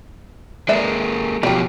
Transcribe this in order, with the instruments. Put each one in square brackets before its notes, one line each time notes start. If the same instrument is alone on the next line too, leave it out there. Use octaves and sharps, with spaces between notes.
[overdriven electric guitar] G#3 A#3 [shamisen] B4 D5 E5
[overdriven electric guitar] B2 F3 [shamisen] F#3 G4